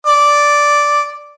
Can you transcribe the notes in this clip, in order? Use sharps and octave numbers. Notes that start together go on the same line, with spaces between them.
D5